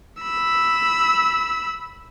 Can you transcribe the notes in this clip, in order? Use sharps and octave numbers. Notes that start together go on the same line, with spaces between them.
B5 E6